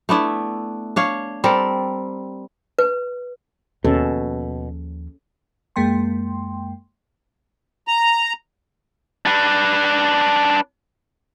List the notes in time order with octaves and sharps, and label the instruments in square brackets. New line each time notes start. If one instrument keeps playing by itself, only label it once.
[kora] A3 B3 D4 E4
D4 C#5 F5
G3 C4 A4 A#4
[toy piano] B4
[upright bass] D#2 F3 [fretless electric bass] B2 [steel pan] C#4 A4
[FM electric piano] F#2 G#3 A#3 G5 C6
[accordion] A#5
[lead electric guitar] D4 B4